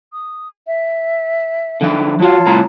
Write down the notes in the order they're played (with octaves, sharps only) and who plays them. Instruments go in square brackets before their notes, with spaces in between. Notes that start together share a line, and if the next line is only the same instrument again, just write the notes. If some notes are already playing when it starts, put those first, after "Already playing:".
[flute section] D#6
E5
[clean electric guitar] D3 F3 E5
[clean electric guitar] F3 F#4 [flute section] F4 C#5 A5
[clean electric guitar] C2 A2 A#5